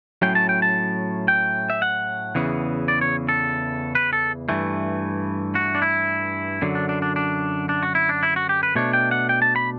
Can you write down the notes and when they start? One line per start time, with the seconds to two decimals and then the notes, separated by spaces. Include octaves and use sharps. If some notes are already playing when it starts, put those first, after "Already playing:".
0.22 A2 F#3 C#4 G5
0.35 A5
0.49 G5
0.62 A5
1.28 G5
1.70 E5
1.82 F#5
2.35 E2 C#3 E3 B3
2.88 D5
3.01 C#5
3.29 A4
3.95 B4
4.13 A4
4.49 G2 E3 A3
5.55 F#4
5.75 D4
5.82 E4
6.62 F#2 D3 F#3
6.75 D4
6.89 D4
7.02 D4
7.16 D4
7.69 D4
7.83 F#4
7.95 E4
8.09 D4
8.23 E4
8.36 F#4
8.49 G4
8.63 B4
8.75 B2 A3 D4 C#5
8.93 G5
9.11 F#5
9.29 G5
9.42 A5
9.56 B5